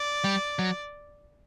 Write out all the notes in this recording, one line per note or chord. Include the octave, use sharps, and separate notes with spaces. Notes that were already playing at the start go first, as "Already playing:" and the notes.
Already playing: D5
G3
F#3